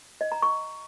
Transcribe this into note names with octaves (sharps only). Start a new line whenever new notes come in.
D#5
A#5
C#6